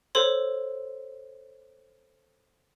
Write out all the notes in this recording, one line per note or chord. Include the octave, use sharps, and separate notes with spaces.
A4 C5 C#5 C6